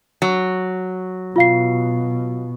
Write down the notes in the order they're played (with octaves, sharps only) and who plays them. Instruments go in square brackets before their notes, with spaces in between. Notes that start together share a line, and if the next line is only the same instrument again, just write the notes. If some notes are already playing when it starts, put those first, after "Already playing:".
[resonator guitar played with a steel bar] F#3
[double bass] B2 [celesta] F4 F5 C7